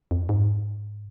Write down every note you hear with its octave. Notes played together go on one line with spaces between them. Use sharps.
F2
G#2